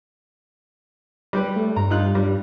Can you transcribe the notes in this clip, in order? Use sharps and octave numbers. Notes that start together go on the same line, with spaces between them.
G3 G4 B4
A3
G2 A#5
D#4 F4 F#6
G2 G3